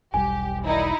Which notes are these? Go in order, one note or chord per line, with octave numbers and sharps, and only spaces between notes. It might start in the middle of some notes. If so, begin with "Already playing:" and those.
E1 B1 G3 G4 G#5
D#3 D#4 E4 D5 D#5